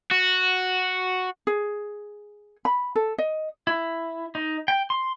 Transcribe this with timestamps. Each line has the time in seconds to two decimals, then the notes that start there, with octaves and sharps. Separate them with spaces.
0.11 F#4
1.47 G#4
2.65 B5
2.96 A4
3.18 D#5
3.67 E4
4.35 D#4
4.68 G5
4.90 C6